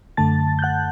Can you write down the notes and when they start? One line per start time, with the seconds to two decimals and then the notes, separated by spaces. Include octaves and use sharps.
0.17 F#2 D3 A3 A5 A6
0.59 G6
0.62 F#5 F#6